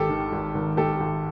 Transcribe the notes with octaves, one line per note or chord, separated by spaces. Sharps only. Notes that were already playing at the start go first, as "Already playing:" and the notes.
Already playing: G#1 G4 A4
D#3
G#1
G#1
G#2 G4 A4
G#1